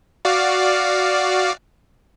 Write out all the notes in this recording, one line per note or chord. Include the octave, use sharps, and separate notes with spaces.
F#4 D5 F5